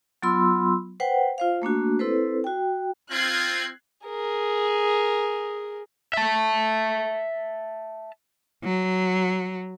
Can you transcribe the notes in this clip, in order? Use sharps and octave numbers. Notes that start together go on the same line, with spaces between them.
F#3 B3 F4 B5 C6 E6
B4 C5 F#5 G5
F4 C5 F5
A3 A#3 D4 F#4
C4 E4 A4 B4 C5
F#4 G5
C4 F4 F#6 G#6 C7
G#4 A#4
E5 A5
F#3